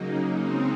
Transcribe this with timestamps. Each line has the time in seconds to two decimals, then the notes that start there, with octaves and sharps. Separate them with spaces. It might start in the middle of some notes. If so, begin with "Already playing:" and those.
Already playing: C#3 F#3 A#3 D#4
0.39 C#3 G#3 C4 D#4